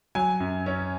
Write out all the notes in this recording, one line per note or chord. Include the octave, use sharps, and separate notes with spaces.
F#3 G#5
F#2
C#4